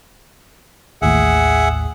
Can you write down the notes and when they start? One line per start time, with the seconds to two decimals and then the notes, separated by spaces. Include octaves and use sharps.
1.02 A1 D#2 A2 G#4 E5 F#5